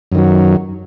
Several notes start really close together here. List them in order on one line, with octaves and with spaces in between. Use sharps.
F#2 D#3 F#3